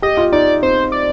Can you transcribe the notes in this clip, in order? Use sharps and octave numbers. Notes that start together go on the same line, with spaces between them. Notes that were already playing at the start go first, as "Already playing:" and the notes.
G4 D#5
F4
D#4 D5
C4 C5
D5